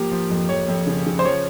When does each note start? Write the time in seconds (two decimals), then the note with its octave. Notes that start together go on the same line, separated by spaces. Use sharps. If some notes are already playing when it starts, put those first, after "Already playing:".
Already playing: F3 A#3 G4
0.11 F3
0.30 F2
0.49 F2 C#5
0.68 F2
0.87 C#3
1.06 C#3
1.19 C5
1.25 F3 C#5